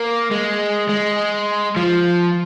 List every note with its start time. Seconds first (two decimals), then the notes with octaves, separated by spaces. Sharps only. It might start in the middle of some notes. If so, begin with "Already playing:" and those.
Already playing: A#3
0.31 G#3
0.89 G#3
1.76 F3